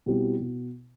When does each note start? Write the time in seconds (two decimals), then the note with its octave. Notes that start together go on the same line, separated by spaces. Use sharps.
0.06 B2 G3 C4 E4 G4
0.40 B2